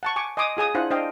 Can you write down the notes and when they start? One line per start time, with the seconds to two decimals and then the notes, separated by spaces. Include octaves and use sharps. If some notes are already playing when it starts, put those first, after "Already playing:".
0.03 F#5 A5 C#6
0.16 G#5 C#6 D6
0.37 D#5 G#5 C6 D6 D#6
0.57 F4 G#4 G#5 D#6
0.74 D4 E4 F4 C5 F#5
0.90 D4 C5 D#5 F5 G5